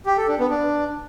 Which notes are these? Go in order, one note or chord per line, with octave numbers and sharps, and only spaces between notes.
G4
A4
D4
B3
D4